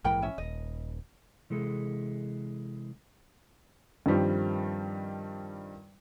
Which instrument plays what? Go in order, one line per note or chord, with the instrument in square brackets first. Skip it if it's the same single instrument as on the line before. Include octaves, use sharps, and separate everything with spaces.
[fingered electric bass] A#1 G#2 E3 [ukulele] A#4 G5 B5
[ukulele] C#4 E5
[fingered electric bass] D#1 [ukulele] D#5
[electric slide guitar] C3 E3 G#3 A4
[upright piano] G2 D#3 F3 G3 C4